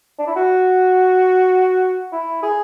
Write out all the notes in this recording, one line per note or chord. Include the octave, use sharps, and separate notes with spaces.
D4
E4
F#4
E4
G#4